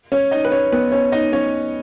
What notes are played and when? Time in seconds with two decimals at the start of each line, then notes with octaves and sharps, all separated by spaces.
0.12 C#4 C#5
0.31 D#4 D#5
0.45 B4
0.52 C#4 C#5
0.72 B3 B4
0.92 C#4 C#5
1.12 D#4 D#5
1.32 C#4 C#5